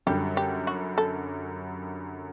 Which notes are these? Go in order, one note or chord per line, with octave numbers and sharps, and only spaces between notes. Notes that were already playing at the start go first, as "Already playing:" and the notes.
F#2 D3 G3 G4
G4
F#4
A4